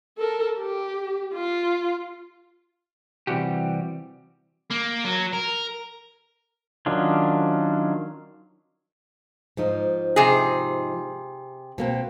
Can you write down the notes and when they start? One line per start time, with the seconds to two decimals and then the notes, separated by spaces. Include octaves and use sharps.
0.18 A4 A#4
0.58 G4
1.33 F4
3.27 C3 E3 G3 F#4 G4
4.70 A#3
5.04 F#3
5.33 A#4
6.86 D#3 F#3 C#4 D4 F4
9.57 G#2 F3 D#4
10.16 C3 G#4
11.78 B2 A#3 C4